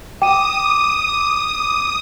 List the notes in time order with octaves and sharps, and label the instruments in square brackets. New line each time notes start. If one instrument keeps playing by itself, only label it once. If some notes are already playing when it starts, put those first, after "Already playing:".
[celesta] G5 [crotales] D6 D#7 [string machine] D#6